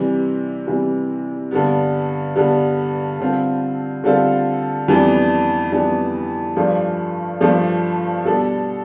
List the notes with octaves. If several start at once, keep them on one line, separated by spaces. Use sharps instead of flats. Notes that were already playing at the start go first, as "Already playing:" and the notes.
Already playing: C3 E3 G3
C3 E3 G3
G2 D3 G3 B3
G2 D3 G3 B3
D3 G3 C4 F4 A4
D3 G3 C4 F4 A4
F2 E3 G3 B3 D4
F2 E3 G3 B3 D4
G2 F3 A3 D4
G2 F3 A3 D4
B2 G3 D4 A4